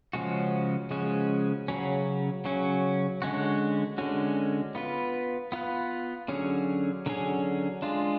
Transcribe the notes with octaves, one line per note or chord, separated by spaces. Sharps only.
C#3 F3 G#3 C#4 F#4
C#3 F3 G#3 C#4 F#4
C#3 F#3 C#4
C#3 F#3 C#4
D3 G#3 C#4 F#4
D3 G#3 C#4 F#4
B3 F4 B4
B3 F4 B4
D3 F#3 C#4 G#4
D3 F#3 C#4 G#4
G#3 D4 F4